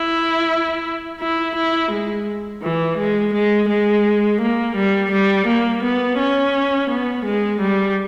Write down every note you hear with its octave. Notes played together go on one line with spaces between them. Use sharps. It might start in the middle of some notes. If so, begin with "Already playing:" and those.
Already playing: E4
E4
E4
G#3
E3
G#3
G#3
G#3
A#3
G3
G3
A#3
B3
C#4
B3
G#3
G3